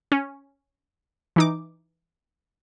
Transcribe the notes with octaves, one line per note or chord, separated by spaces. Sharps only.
C#4
E3 D#4 D6